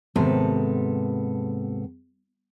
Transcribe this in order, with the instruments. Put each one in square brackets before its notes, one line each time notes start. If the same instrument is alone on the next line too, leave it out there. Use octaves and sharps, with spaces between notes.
[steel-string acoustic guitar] D#2 G#2 C3 B3 A4